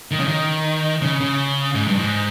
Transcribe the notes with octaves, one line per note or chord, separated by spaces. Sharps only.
D#3
C#3
D#3
C#3
C#3
G#2
G2
G#2